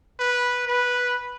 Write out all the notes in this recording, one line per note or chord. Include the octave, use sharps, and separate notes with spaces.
B4
B4